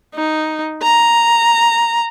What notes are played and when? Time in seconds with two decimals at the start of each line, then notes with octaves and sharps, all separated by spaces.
0.15 D#4
0.83 A#5